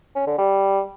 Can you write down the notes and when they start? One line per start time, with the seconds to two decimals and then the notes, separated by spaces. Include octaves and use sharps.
0.16 C#4
0.27 D3
0.38 G3